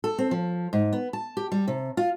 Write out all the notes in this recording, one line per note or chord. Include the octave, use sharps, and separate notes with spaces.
A4
C4
F3
G#2
B3
A5
G4
G3
C3
F4